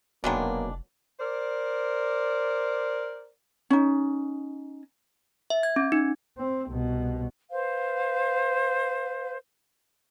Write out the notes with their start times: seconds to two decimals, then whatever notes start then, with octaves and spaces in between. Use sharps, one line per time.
0.24 F1 B2 D#3 F#3 G#3 A#3 B3 D4
1.20 A#4 C5 D5
3.70 C#4 D#4
5.50 E5
5.63 G#6
5.76 C#4
5.92 D#4
6.38 C4
6.69 C2 B2
7.51 B4 C5 F5